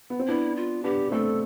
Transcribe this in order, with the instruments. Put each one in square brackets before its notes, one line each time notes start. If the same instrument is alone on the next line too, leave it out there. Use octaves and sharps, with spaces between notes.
[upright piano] B3
C4
[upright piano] B3 D4 [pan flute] E4
[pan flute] F4
[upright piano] B3 D4 [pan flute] G4
[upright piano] A3 C4 [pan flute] A4